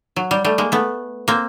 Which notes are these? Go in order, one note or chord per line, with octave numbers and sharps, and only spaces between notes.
F#3
G3
G3 A3
G#3 A#3
A3 B3
A#3 C4